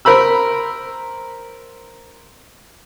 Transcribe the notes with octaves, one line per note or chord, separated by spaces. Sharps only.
A#4 C5 B5 E6